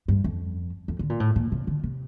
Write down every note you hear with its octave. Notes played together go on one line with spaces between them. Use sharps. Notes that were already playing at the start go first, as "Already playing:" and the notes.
G2
F2
F2
D3
A#2
A2
A#2
C3
D3
C3